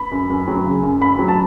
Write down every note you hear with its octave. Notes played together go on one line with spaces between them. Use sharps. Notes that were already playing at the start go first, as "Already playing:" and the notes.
Already playing: B5
F#2
F#2
F#3
C#3
F#2
F#2 B5
F#3
A5